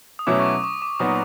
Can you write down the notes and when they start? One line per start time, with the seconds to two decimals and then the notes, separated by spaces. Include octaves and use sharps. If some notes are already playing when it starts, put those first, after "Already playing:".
0.19 D#6
0.27 B2 F#3 A3 C#4 E4 D6
0.40 C#6
0.46 D6
0.64 C#6
0.82 D6
1.00 A#2 F#3 B3 D#4 F#4 D#6